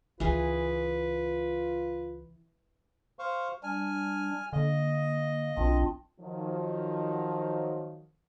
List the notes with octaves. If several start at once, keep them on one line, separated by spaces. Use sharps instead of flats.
C#2 E3 F4 G#4 B4
C5 F5 C#6
G3 D4 G#5 F6
D3 A#3 D#5
B1 C4 D4 F4
D#3 F3 F#3